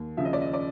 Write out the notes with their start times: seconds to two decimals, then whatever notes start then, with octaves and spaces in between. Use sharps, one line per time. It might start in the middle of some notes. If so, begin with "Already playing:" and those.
Already playing: D#2
0.17 C#3 F3 E5
0.25 D#5
0.33 D5
0.41 D#5
0.53 D5